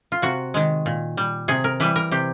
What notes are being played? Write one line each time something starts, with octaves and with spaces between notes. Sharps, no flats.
F4
C3 F#4
D#3 G#3
A#2
G3
C3 G#4
A#4
E3 G3 B4
A#4
C3 G4